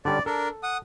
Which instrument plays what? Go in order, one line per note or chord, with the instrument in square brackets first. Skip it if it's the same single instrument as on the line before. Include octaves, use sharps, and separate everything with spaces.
[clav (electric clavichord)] D3 G3 C#4 [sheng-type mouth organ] D5
[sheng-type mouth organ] D4 A#4 [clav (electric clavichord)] A4
[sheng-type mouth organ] F#5 D#6